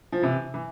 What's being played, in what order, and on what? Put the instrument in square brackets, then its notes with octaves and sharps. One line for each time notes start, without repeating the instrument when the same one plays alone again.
[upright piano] F3
C3 E3
E3